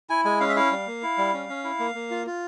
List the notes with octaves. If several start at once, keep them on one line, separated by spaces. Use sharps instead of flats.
E4 G#5
G#3 G#5
C#4 F5
E5
E4 F5
G3
A#3
E4
G3
C#4
C#4
E4
A#3
A#3
F4
F4